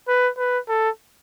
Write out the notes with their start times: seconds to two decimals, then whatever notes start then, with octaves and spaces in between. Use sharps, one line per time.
0.08 B4
0.38 B4
0.69 A4